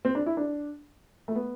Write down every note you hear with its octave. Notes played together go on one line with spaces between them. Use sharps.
C4
D4
E4
D4
A3
B3